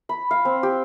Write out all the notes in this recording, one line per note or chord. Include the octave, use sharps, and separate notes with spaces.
B5
F5
C4
G4